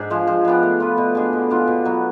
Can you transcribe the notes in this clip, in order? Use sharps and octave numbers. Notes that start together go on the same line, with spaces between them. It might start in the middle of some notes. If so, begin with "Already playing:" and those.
Already playing: G#2 D4 G#4
F3 G#3
F3
G#3 B3 D4
A3
F4 B4
B2
G#3 D4 G#4
D3
G#3 D4 F4
B2
F#3 B3